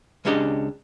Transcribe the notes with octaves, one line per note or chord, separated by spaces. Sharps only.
C#2 G#3 C#4 D4 G4 D#5